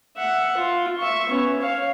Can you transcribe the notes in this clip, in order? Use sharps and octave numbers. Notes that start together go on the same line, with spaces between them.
E5 F#5
F4
E5 C#6
B3 C#4
C#5 F5